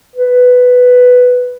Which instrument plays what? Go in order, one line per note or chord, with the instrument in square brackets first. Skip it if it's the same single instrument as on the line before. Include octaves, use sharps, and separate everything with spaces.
[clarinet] B4